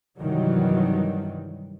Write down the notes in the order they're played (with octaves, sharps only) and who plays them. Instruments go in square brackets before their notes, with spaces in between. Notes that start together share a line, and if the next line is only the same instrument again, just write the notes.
[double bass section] G2 C3 D#3 E3 F#3 G3